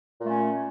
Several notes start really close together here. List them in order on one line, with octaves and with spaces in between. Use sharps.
A#2 A3 C#4